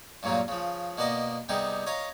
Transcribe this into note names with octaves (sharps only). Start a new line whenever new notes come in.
G2 A#2 C#3 F#3 A#3 F4
C#3 F3
B2 A#3 B3 D5 D#5 D6
C3 G3 B3 D#4 G4 G#4
C#5 D#5 F5 A#5 D#6